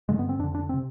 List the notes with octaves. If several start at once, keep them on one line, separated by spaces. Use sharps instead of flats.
G2 D3 G#3
B3
C4
F2 D3 D4
D4
C4
C3